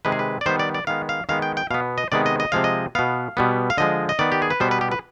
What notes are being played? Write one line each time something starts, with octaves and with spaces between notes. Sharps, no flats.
C3 D#3 G#3 B4
G#4
B4
D5
D#3 G3 B3 C5
D5
D5
D#3 G#3 B3 F5
F5
D#3 G#3 B3 F5
G5
G5
B2 B3 F5
D#5
C3 D#3 G#3 B3 D5
D#5
D#5
C3 F3 G#3 F5
D#5
B2 B3 F5
B2 G3 B3
F5
D3 F3 G#3 D#5
D#5
D#3 B3 D5
G4
G#4
B4
B2 G3 B3 C5
B4
G4
B4